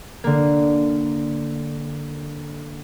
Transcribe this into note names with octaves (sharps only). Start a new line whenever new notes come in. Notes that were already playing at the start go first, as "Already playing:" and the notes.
D3 A#3